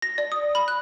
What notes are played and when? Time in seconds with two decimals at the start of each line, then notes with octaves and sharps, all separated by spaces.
0.02 A#6
0.18 D5
0.32 D#6
0.55 B5
0.68 F#6